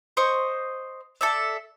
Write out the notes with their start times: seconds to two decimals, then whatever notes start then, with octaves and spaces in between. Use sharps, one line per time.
0.17 C5 D#5 C#6
1.21 A4 D5 E5